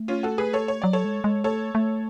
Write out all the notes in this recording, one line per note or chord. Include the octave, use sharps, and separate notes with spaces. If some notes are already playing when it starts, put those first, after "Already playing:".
Already playing: A3
C#4 F4
F#4 A4
G#4 B4
A4 C#5
C#5
F#3 D5
A4 C#5
G#3
G#3
A3 A4 C#5
A3